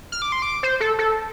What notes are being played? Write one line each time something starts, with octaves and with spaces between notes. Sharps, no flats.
F6
D6
C6
D6
C5
A4
A4